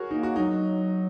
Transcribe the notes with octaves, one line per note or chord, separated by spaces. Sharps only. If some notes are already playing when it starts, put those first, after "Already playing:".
Already playing: F#4 G#4 A#4 C#5
A#3 D#4
F#4
F#3 D#4